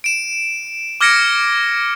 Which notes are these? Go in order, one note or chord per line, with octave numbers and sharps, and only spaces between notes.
D7 E7
D6 F6 G#6 A#6 C#7 D7